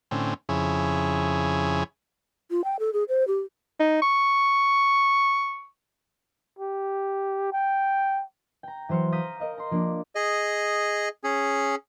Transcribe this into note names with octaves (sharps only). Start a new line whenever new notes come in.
A2 D3 C4 C#4
F2 C#3 E4 G#4 C#5
F4
G5
A4
G#4
C5
G4
D#4
C#6
G4
G5
G5 A#5
E3 F#3 C5 F6 C#7
F5 A#5 D#6 G6 B6
A#4 D#5 F5
A#5 C6
F3 A#3 D4
G#4 D#5
C#4 G#4